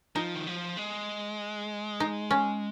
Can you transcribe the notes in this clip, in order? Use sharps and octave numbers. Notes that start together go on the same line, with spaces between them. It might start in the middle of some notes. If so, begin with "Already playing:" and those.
F3 D#4
D#3
F3
G#3
D#4
C#4